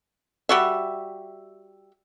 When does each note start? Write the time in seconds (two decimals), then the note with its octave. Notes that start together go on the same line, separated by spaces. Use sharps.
0.49 G3 F#4 E5